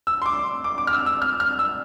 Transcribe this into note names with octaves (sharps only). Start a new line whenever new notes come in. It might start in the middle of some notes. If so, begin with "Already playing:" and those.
E6
C6
D6
D6
D6
F6
E6
E6
F6
F6
E6